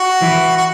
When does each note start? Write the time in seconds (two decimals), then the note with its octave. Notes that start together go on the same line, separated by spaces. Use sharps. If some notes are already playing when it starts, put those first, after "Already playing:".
Already playing: F#4
0.21 E3
0.57 F#4